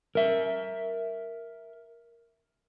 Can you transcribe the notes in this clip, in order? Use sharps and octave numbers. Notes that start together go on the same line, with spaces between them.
A#4 E5